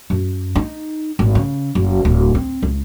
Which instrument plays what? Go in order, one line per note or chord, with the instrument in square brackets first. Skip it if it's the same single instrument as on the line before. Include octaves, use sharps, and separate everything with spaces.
[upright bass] F#2
D#4
G#1
C#3
F#1
D1
C4
C#2